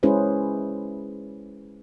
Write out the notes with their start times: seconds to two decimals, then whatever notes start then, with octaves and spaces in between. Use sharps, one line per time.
0.03 G#3 C#4 E4 G#4 B4 C5